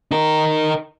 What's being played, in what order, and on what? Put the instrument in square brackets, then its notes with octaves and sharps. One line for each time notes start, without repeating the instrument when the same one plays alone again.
[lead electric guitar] D#4 A#4